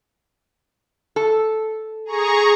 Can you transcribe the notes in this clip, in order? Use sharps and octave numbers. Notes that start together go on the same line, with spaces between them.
A4
G#4 A#5 C#6